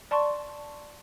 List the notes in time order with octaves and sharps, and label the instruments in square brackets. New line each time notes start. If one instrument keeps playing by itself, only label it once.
[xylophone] D5 A5 C6 C#6